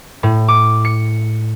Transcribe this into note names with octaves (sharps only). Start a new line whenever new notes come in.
A2
D6
C#7